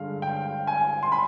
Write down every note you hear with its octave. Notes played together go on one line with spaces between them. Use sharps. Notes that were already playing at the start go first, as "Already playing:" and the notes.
Already playing: G2 D3 G#3 F5
G5
G#5
C6
B5